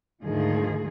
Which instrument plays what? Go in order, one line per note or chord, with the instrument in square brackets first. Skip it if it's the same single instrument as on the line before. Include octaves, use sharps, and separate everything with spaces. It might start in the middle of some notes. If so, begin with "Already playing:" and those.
[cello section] D2 G#2 D#3 F3 G#4